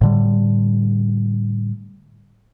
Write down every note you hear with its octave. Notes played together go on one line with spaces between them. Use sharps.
A2 D3 G3